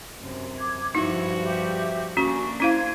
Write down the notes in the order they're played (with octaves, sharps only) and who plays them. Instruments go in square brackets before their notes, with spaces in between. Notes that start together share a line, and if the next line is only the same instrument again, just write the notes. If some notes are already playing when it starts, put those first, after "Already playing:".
[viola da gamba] F#2 C3
[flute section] D6 G#6
[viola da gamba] G2 F3 F#4 [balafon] D#4 [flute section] E4
[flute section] G4 E5
[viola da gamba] A#3 D4 [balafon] C#4 F#4 [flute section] G#5 C#6
[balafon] C#4 E4 F5 [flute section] C5 G#6